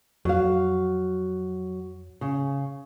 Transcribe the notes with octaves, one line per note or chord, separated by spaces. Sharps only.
F2 F#3 F5
C#3